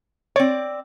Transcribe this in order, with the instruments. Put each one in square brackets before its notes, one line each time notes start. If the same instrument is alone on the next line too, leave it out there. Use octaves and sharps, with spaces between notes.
[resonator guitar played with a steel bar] C4 D5 [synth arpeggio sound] C#5